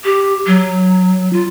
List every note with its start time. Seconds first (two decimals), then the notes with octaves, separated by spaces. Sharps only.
0.05 G4
0.47 F#3
1.33 F4